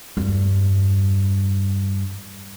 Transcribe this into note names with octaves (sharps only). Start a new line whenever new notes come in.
E2 G2